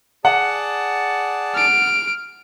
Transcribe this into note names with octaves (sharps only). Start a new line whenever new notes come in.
G#4 D5 F#5 A5
F6 D7